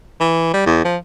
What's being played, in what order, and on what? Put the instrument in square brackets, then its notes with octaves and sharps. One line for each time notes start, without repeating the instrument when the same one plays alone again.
[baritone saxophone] E3
G3
E2
F3